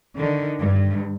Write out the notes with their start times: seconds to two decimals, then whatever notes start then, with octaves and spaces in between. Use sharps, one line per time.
0.16 D3 D#3
0.59 G2